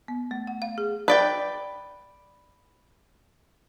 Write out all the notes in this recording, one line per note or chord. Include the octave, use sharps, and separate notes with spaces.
B3
A3
F#5
F5
G#4
B4 D5 G5